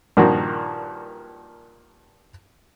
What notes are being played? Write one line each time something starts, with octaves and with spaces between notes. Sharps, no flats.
G2 A#2 D#3 F3 A#3 F#4